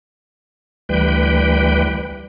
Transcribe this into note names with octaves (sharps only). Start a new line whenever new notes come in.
D2 E3 G3 B4 G5